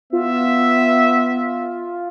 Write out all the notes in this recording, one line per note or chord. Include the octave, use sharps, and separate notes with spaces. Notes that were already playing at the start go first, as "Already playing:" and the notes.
B3 F4 E5